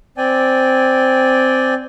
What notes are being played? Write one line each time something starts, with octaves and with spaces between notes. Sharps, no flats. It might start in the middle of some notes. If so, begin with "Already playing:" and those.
C4 D5 G5 G#5